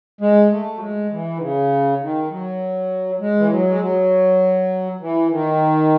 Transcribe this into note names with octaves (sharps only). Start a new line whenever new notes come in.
G#3
A3
F#3
G#3
E3
D#3
C#3
D#3
F#3
G#3
E3
F#3
G#3
F#3
E3
D#3